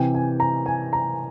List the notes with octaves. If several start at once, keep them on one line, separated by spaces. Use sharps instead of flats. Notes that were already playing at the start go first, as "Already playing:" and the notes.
Already playing: C3 E3 G5
G#5
A#5
G#5
A#5